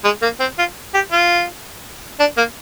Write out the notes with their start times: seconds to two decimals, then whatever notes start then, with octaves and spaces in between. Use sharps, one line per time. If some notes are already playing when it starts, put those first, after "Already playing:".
0.04 G#3
0.22 A#3
0.40 C4
0.59 F4
0.94 G4
1.12 F4
2.20 D4
2.38 A#3